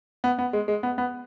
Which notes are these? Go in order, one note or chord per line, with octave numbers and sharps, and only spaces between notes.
B3
B3
G#3
G#3
B3
B3